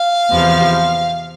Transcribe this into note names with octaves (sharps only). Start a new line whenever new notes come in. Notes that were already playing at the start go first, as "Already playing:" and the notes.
Already playing: F5
E2 C3 F3